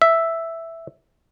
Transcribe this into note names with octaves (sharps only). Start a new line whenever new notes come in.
E5